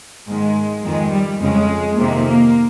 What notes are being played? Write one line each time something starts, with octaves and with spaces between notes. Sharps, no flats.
G#2 D#3 G#3
F2 D#3 G#3
G3
F2 C#3 G#3
F2 C3 D#3 A#3
A#3